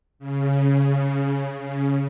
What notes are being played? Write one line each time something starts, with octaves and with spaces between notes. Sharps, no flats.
C#3
C#3